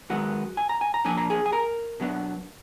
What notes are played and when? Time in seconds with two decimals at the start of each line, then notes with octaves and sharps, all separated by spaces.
0.10 F#2 D#3 G#3 B3 F#4 F#5
0.57 G#5
0.69 A#5
0.81 G#5
0.94 A#5
1.05 A#2 F3 A#3 D4 G#5
1.17 A#5
1.30 G#4 G#5
1.46 G#5
1.52 A#4 A#5
2.00 B2 F#3 B3 D4